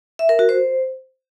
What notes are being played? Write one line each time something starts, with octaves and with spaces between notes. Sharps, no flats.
E5
A#4
F#4
C5